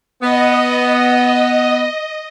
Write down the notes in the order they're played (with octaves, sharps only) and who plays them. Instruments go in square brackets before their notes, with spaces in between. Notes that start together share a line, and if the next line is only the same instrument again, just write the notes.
[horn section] B3 [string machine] D#5